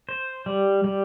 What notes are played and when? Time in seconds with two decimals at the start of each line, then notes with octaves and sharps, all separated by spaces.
0.09 C5
0.46 G3
0.84 G3